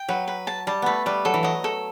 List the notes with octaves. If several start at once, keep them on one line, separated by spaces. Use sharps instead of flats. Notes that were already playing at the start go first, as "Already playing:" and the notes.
Already playing: G5
F#3 B4
B4
A5
G3 A5
A3 B3 B4
G3 B4
F#3 A4
E3
F#3 D#5
A4